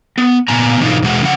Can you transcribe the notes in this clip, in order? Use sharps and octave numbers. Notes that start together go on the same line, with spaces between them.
B3
A#2 B3 G#5 A#5
G#2 B2 E3 D4 D#4 F4
E2 B2 G#3 F#4 F#5
C#3 F3 F#5